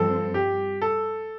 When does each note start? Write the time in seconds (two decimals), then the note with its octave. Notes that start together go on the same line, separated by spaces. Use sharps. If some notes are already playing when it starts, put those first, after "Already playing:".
Already playing: G2 F3 C4 A4
0.34 G4
0.81 A4